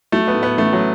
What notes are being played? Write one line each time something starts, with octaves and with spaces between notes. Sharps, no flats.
F#3 A3
B3
A2
B3
A1 A3
F#3